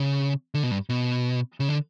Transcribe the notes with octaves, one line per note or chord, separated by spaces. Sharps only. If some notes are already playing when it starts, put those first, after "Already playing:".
Already playing: C#3
D3
B2
G2
B2
C#3
D3